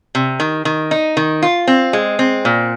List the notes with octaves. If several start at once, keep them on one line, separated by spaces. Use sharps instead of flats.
C3
D#3
D#3
D#4
D#3
F4
C4
G#3
C4
A#2